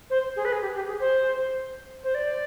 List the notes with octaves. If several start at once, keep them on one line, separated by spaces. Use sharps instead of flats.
C5
G#4
B4
G#4
G4
G4
G#4
C5
C5
D5